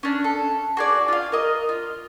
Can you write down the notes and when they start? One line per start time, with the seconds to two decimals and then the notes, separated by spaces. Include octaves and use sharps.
0.03 C#4 D4
0.24 A4
0.77 F#4 G#4 D5
1.08 F4 F5
1.32 A#4 D#5
1.69 F4